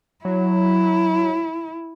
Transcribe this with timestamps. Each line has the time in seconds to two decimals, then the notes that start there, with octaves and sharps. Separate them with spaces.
0.25 F#3 E4